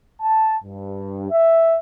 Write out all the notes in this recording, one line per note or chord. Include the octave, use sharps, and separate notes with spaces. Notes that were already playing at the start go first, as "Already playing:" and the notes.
A5
G2
E5